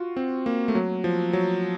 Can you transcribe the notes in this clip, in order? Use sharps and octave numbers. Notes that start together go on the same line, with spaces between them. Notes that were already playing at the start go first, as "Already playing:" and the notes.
Already playing: F4 F#4
C4
A#3
A3
F#3
F3
F#3